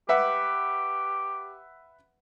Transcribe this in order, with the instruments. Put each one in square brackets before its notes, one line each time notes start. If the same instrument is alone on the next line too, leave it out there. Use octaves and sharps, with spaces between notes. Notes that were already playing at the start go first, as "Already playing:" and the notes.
[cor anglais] G4 [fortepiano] B4 E5 F#5